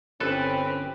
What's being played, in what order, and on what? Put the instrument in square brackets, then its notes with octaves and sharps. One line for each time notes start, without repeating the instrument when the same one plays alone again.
[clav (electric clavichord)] G1 A4 [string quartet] C4 G4 [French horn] C#4 [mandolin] B4